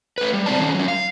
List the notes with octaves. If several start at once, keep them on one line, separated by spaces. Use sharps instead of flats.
A3 B4
G3
C3 G3 C4 D5 A5
D#3 F3 C#4
F#3 C#4
F5